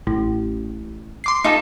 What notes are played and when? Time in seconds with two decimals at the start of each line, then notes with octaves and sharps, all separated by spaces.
0.07 A1
1.24 C6 D6 C7
1.44 D#4 F4 A4